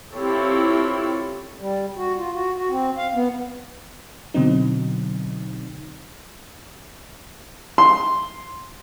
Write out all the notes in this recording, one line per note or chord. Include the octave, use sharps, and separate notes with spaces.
C4 E4 F4 G4 A4 C#5
G3
F#4
F4
F#4
F#4
C4
F5
B3
B2 D3 F#3 C4 D#4
C6